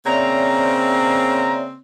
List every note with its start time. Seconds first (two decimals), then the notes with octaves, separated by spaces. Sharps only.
0.06 C#3 A#3 C4 C#5 D5 E5 A#5